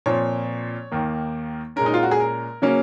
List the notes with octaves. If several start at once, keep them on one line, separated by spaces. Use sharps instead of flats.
A#2 F3 C4 C#5
D#2 D#3 A#3
A#2 G#3 C#4 A#4
D#4
F4
F#4
G#4
A#4
C#3 F#3 A#3 C#4